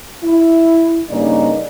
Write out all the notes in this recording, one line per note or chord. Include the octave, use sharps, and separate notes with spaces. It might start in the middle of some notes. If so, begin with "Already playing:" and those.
E4
G2 C#3 A#3 D#4 D5